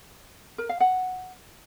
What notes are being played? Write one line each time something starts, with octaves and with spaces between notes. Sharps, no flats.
A#4
F5
F#5